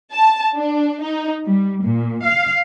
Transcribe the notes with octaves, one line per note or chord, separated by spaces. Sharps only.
A5
D4
D#4
G3
A#2
F5